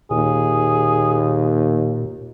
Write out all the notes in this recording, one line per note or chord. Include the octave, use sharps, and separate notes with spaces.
D#2 A#2 G#4